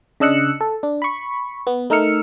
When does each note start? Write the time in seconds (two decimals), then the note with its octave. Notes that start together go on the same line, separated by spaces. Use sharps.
0.20 C#3 D4 D#5 E6 F#6 C#7
0.61 A4
0.83 D4
1.02 B5 C#6
1.67 B3
1.90 A3 D#4 A#4 E6 F6 C#7